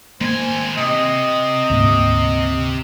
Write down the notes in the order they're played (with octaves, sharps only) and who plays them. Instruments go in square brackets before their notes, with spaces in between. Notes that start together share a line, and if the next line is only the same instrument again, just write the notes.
[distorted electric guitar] D#3 G#5 [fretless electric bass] A#3 [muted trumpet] C5
[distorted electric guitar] C3 [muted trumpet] D#5
[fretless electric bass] D2 G#2 A#3